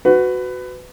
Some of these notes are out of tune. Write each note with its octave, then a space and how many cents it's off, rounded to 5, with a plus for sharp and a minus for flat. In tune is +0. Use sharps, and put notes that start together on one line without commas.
F#4 +0 B4 +20